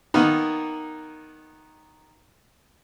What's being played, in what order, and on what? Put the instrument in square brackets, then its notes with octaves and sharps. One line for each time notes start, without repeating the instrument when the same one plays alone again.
[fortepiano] D#3 A#3 B3 D#4